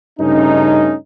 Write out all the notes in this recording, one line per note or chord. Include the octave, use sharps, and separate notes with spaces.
G2 C#3 A3 C#4 D#4